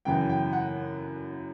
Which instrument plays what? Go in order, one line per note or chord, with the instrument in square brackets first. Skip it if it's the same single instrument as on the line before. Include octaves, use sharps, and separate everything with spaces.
[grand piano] F#2 C#3 E3 G5
G5
F#5